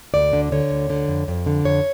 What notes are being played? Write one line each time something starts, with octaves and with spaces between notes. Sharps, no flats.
D2 D5
D3
D3 C#5
D2
D3
F2
F2
D3
F2 C#5